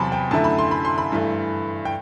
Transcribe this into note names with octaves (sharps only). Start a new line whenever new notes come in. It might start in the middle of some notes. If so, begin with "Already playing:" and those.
Already playing: E2 C3 F#3 A5 B5 C6
G5
F#2 D3 A3 E4 A5
B5
C6
B5
C6
B5
G2 E3 A3
G5